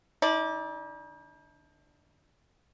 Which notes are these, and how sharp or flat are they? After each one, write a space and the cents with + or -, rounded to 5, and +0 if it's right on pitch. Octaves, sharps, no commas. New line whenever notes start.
D3 +0 D#4 +45 D5 +0